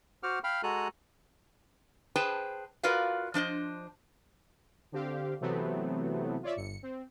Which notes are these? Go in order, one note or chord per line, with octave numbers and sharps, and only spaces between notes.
F#4 C5 F#5 D6 F6
F5 G5 B5 F6
G#3 F#4 A4 G#5 A#5 F#6
G#4 B4 C5 G5 A5
F4 F#4 A#4 B4 D5 F5
F3 D4 C5 D#5
D3 C4 G4 F5
C3 E3 F#3 A3 B3 C4
F4 C#5 D5 E5
G1 C#7
C4